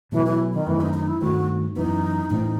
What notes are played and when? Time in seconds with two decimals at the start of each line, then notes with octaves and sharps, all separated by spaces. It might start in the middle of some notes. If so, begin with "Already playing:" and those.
0.12 B2 E3 F#3 A3
0.26 E3
0.53 D#3
0.67 F#2 D#3 E3 A3 C4
0.81 D#4
0.94 D#4
1.07 E4
1.21 G2 D#3 A3 C4 F#4
1.76 F#2 E3 B3 D#4
2.30 A2 E3 A3 C4 D#4